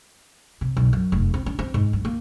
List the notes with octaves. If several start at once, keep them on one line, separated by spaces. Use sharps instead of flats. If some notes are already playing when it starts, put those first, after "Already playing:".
C3
B1
F#2
F1
C4
C#4
C4
G#2
G2
A#3